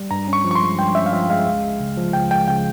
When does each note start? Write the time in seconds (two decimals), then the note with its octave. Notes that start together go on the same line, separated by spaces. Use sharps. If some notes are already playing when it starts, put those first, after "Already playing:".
Already playing: G3
0.11 G2 A#5
0.28 C#4
0.33 C#6
0.44 F3
0.51 C#6
0.55 C6
0.62 G#3
0.79 G2 G5
0.95 C#4 E5
1.06 F5
1.13 F3 E5
1.29 G#3 F5
1.46 C#2
1.64 G#3
1.80 C#3
1.97 F3
2.13 C#2 G5
2.31 G#3 G5
2.48 C#3 G5